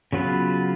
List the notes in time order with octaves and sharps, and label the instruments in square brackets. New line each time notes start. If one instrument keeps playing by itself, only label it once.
[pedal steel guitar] C#3 F#3 B3 F4 B4